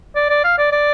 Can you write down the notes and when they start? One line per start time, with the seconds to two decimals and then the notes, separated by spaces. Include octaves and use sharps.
0.15 D5
0.29 D5
0.44 F5
0.58 D5
0.72 D5